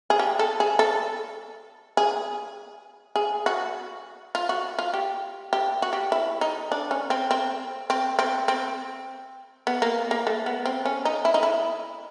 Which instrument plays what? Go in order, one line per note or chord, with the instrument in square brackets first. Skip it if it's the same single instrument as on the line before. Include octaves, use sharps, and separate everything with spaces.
[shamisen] G#4
G4
A4
G#4
A4
G#4
G#4
F#4
F4
F#4
F4
G4
G4
F#4
G4
E4
D#4
D4
C#4
C4
C4
C4
C4
C4
B3
A#3
A#3
A3
B3
C4
C#4
D#4
E4
D#4
E4